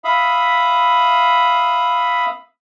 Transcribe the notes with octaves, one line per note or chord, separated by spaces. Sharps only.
E5 F5 B5 D#6